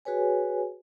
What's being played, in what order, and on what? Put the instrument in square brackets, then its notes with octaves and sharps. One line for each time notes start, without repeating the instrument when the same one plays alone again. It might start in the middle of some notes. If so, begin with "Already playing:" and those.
[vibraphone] F#4 G#4 B4 C#5 G#5